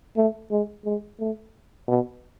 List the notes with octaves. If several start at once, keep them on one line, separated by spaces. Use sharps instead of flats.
A3
G#3
G#3
A3
B2